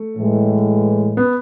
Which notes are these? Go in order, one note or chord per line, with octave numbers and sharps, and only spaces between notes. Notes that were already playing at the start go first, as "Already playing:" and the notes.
Already playing: A3
A2 E3 G#3
B3